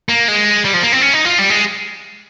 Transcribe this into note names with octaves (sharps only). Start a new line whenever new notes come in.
A#3
G#3
G3
F3
A#3
C4
C#4
D#4
F4
G3
G#3